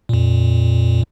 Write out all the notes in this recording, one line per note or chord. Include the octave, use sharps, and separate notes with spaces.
F2 A#2